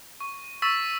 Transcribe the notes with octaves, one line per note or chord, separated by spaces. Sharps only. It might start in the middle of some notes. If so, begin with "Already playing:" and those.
C#6
C#6 E6 A6 B6 E7